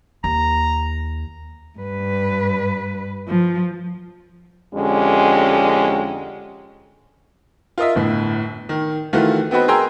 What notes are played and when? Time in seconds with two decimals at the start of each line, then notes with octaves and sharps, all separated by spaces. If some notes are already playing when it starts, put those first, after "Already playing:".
0.24 D#2 A#5
1.79 G2 B4
3.27 F3
4.74 F2 D3 G#3 C#4 G4
7.78 F4 A#4 D#5 E5
7.95 G1 A2
8.69 D#3
9.13 D#3 E3 A3 F4 F#4
9.51 B3 C4 D#4 F#4 B4
9.68 G#4 A#4 G5 A#5 C6 E6